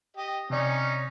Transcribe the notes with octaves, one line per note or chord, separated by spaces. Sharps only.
G4 D#5
C3 C#4 D#4 D5